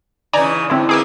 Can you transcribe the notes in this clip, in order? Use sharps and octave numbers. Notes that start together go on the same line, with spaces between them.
C#3 E3 D#4 D5 G#5 A#5
G#2 D3 C4 E4
A#3 B3 D#4 G#4 D6 E6